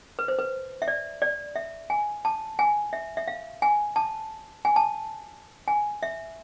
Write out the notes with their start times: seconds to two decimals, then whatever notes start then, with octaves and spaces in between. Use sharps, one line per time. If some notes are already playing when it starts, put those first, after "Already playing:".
0.19 B4
0.28 C5
0.39 B4
0.82 E5
0.88 D5
1.22 D5
1.56 E5
1.90 G#5
2.25 A5
2.59 G#5
2.93 E5
3.17 E5
3.28 F5
3.62 G#5
3.96 A5
4.65 G#5
4.76 A5
5.68 G#5
6.03 E5